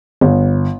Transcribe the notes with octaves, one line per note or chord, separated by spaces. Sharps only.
G1